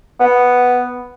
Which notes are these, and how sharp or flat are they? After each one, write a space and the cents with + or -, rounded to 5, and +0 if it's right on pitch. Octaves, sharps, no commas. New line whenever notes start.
B3 +0